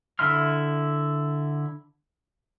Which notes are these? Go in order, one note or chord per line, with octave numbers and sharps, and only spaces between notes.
D3 E4 E5 C6 F6